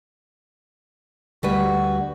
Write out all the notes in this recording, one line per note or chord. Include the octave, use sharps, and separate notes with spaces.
D2 G3 F#4 B4